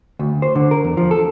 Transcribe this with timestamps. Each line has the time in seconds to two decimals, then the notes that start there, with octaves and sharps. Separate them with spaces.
0.19 D2
0.42 C5
0.55 D3
0.71 A#4
0.84 E2
0.97 F3
1.11 A4